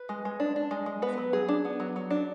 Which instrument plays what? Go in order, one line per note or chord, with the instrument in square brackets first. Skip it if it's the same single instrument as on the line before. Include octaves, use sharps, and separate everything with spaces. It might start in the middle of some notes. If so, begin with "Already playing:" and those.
Already playing: [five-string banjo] B4
G#3
G#3
D4
D4
G#3
G#3
B3 B4
F#3
F#3 G#4
D4
B3
F#3
F#3
D4